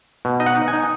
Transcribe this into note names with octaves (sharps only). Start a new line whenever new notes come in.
B2
D#4 D#5
F#5
D#4
G#5
D#4